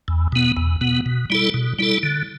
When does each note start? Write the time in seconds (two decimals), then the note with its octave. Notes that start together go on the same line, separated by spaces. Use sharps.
0.08 E2
0.32 B2 B3
0.57 E2
0.81 B2 B3
1.06 B2
1.30 G3 E4 A4
1.54 B2
1.79 G3 E4 A4
2.03 D3